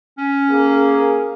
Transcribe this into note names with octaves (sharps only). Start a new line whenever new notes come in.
C#4
A#3 G#4